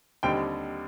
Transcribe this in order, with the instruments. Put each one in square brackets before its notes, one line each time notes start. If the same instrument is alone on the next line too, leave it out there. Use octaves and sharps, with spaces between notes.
[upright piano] D#2 D3 G3 C4 D#4 G5